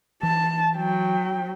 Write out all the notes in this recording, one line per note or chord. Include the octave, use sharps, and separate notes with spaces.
E3 A5
F#3 G5